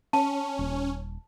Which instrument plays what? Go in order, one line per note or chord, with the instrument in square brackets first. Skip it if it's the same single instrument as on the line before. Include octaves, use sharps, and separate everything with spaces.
[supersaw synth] C#4 [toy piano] A5
[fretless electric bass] D#1